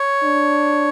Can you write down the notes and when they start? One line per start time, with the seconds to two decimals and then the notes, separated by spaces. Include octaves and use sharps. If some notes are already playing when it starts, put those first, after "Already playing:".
Already playing: C#5
0.24 D4